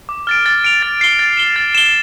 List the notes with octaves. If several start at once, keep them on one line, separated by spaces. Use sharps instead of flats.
D6
F6 A6 D7
A6
D7 F7
A6
C7 G7
A6
E7 G7
A6
E7 G7